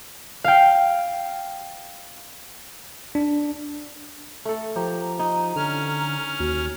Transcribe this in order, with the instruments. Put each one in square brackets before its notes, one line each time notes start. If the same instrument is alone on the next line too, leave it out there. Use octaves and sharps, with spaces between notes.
[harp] F5 G5
[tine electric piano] D4
[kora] A3 A4
[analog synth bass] F3 [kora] G4 [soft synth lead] A#5
[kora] D#4
[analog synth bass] D3 [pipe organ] C#4 F6
[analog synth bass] D#2 [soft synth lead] F#4